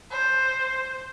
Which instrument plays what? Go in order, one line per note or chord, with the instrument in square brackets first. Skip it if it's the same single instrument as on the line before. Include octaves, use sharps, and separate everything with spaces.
[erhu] C5